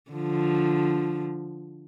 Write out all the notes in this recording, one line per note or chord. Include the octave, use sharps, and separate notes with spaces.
D3 F3